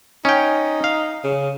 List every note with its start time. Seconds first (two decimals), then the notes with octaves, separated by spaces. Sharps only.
0.25 C#4 D#4 G5
0.84 F5
1.24 C#3